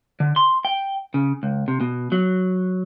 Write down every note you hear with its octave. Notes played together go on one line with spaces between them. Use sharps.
D3
C6
G5
C#3
C#2
C3
B2
F#3